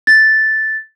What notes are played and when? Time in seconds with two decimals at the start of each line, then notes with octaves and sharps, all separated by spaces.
0.07 A6